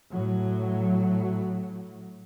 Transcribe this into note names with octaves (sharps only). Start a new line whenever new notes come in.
A2 F#3